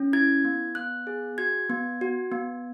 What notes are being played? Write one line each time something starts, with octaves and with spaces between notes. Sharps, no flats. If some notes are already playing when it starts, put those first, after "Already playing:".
Already playing: C#4
E4 G#6
B3
B3 F#6
G#4
F#4 G#6
B3
F#4
B3